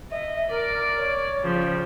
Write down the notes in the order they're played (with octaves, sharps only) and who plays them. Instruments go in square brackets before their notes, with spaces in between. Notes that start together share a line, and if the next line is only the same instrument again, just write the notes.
[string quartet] D#5 [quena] E5
[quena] A#4 [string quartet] D5 D6
[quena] C#5
[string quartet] C#3 F3 G3